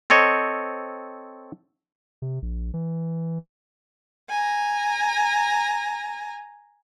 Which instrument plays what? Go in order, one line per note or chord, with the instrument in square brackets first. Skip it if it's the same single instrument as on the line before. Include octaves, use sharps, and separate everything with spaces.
[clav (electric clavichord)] C4 A4 C#5 D#5
[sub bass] C3
A#1
E3
[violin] G#5 A#5